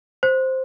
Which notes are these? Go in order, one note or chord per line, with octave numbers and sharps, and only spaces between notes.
C5